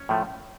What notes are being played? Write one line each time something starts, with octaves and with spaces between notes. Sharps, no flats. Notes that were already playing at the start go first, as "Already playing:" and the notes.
Already playing: C#4 C#5
A2 F3 A3